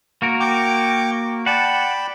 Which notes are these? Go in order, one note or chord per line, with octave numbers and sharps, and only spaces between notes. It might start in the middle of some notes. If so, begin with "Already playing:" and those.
A#3 F#4 A#4
G5 C#6 D6
D5 F#5 G5 A5 B5